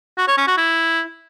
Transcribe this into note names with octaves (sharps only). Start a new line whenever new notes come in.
F#4
C#5
C#4
F#4
E4